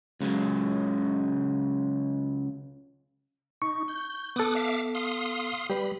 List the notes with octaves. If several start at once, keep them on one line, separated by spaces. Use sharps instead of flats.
C#2 C#3 F#3
D#4 C#6
G6
B3 A4 D6 D#6 F#6
E5 F5 D6
F5 C6 D#6
G3 G4 B4 B5